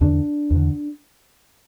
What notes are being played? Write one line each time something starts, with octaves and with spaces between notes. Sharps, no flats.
E2 D3 D4
E2 D3